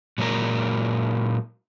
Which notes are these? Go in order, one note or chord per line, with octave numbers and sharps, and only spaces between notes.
A#2 F#3 G#3 A#4